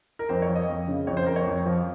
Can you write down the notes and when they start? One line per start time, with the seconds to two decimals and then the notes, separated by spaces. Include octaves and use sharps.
0.19 A#4
0.29 F2 C5
0.42 C#5
0.49 F3
0.55 D#5
0.69 F2
0.88 C#3
1.07 F2 C#5
1.17 C5
1.26 F2 A#4
1.36 C#5
1.46 F2
1.66 F3